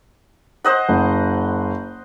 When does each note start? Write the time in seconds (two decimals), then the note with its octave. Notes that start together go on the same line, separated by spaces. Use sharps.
0.64 C5 D#5 F#5
0.88 F#1